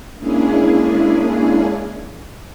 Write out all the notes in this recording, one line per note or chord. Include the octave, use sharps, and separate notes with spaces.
G#3 A#3 C#4 D4 E4 G#4